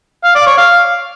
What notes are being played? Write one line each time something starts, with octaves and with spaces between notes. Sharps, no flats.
F5
D5
C#5
F5